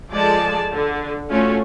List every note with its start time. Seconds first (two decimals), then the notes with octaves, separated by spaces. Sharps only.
0.10 F3 G#3 G#4 A4 D5 A5
0.74 D3
1.31 A3 C#4 F4 F#4